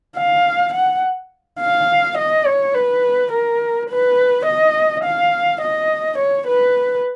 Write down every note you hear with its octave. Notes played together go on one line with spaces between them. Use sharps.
F5
F#5
F5
D#5
C#5
B4
A#4
B4
D#5
F5
D#5
C#5
B4